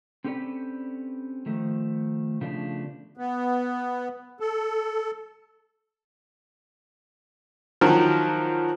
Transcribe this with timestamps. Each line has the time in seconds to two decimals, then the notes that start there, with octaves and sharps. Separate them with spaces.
0.24 C4 C#4 G4 A4 B4 D5
1.46 D#3 F3 A3
2.41 C#3 F3 A3 B3 D4 G4
3.17 B3
4.40 A4
7.81 D#3 F3 F#3 A#4